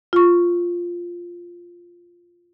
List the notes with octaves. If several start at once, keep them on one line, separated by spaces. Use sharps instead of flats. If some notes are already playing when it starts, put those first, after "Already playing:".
F4 C#6